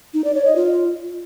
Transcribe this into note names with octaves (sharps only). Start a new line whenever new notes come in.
D#4
D5
C#5
D#5
F4